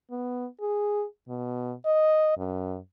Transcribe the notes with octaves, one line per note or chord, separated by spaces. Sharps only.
B3
G#4
B2
D#5
F#2